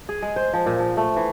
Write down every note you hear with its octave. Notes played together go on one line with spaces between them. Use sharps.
G#4
G#3
C5
F3
A#2
F3
A3
E3